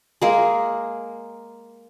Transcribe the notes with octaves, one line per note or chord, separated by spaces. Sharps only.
G#3 A#3